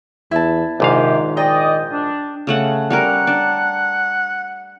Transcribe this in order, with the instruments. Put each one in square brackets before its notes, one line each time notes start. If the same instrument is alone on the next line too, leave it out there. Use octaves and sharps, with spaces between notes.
[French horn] E2 [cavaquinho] E4 A5
[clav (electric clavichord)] A#1 G#2 F5 [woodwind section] C3 G4 [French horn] D#3
[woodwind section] D5 D#5 [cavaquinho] G5
[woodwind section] D4
[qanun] C#3 A3 F#5
[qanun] G3 C#4 A#4 [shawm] F#5
[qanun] D4